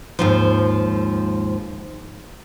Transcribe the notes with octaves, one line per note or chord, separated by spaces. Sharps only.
D#2 G#2 F3